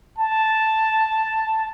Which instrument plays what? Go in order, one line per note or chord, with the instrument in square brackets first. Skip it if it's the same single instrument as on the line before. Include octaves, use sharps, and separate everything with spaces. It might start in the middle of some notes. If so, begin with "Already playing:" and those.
[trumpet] A5